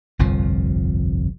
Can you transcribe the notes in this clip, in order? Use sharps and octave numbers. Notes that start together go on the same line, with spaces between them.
G1 C2 F2 F3